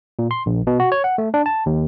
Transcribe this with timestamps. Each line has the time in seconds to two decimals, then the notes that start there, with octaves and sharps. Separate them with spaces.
0.19 A#2
0.31 C6
0.46 A#1
0.67 B2
0.80 F#4
0.92 C#5
1.04 F#5
1.18 A3
1.34 D4
1.46 A5
1.66 D#2